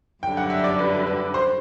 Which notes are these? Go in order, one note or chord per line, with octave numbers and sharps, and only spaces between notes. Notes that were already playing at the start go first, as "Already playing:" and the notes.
F#2 D3 G3 D4 G5
F#5
E5
D5
B4
B4
C5